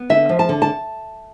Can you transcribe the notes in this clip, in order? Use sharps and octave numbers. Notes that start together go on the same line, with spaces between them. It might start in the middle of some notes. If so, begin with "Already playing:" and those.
Already playing: B3
D3 E5
F3
A5
D3
A5